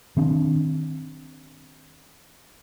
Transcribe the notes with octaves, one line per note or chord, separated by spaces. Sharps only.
D#3 C4 D4